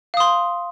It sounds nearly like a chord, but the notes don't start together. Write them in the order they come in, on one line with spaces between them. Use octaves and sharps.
F5 D#6 C6